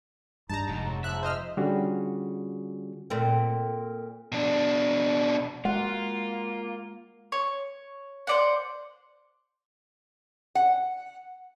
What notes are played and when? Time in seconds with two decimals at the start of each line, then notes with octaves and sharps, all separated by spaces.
0.49 G2 G3 D#4 A5 A#5
0.69 F1 G#2
0.85 F#3
1.04 G#2 F3 E5 F#6
1.23 C5 D#5 F6
1.57 D3 G3 C#4 F4 F#4 G#4
3.10 A#2 A3 C4
4.32 B2 D4
5.65 G#3 A#3 F4 F#5
7.32 C#5
8.27 C5 D5 F#5
10.55 F#5